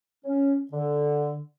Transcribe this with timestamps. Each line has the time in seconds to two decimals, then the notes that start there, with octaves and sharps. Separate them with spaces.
0.25 C#4
0.72 D3